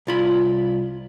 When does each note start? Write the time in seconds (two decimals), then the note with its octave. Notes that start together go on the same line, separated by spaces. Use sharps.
0.07 C2 F4 B5